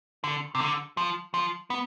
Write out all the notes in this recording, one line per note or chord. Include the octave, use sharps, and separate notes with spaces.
D3
C3
D3
F3
F3
B3